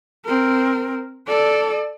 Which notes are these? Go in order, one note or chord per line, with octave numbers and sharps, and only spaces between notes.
C4 A#4
A4 D5